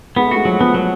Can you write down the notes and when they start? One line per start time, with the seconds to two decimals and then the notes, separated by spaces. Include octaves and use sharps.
0.16 G#3 B3
0.26 A3
0.31 G#3 F#4
0.45 F3 F#3
0.60 F3 B3
0.74 F#3